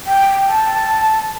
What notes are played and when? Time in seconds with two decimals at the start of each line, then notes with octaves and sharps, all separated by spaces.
0.07 G5
0.48 A5